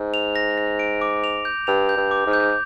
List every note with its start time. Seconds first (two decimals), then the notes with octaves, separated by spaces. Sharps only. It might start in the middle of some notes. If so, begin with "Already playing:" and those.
Already playing: G#2
0.14 F7
0.36 A#6
0.57 A#6
0.79 D7
1.01 D6
1.24 F7
1.45 G6
1.67 G2 F7
1.89 G6
1.97 G2
2.11 D6
2.26 G#2
2.33 G6